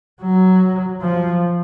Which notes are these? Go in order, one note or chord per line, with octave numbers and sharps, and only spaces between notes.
F#3
F3